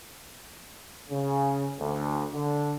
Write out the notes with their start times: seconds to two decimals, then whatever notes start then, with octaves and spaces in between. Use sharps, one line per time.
1.10 C#3
1.78 D2
2.32 D3